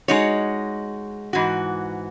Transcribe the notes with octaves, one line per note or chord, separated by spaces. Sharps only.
G#3 D#4 F#4 C#5
G#2 E3 F#4